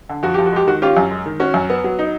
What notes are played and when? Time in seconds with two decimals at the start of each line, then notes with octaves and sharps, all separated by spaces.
0.09 D3
0.23 F2 F#4
0.34 F2 G4
0.46 F#4
0.52 G#3 G4
0.67 D#3 F#4
0.82 C#4 F4 G4
0.97 F#2
1.11 G#3
1.26 D#3
1.40 C#4 F#4
1.54 F#2
1.70 B3
1.84 F#3
1.99 D#4